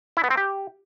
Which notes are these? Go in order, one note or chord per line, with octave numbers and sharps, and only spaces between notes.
E4
B3
C4
G4